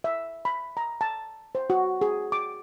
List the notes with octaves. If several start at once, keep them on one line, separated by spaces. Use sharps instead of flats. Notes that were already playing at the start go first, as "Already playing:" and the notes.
E5
B5
A#5
A5
C5
F#4
G#4
D6